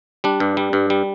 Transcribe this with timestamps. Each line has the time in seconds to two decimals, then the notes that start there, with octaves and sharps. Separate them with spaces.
0.24 G3 D4
0.40 G2
0.57 G3
0.73 G2
0.90 G3